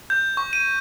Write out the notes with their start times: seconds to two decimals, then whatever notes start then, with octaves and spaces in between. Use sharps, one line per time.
0.10 G6
0.37 C#6
0.53 D#7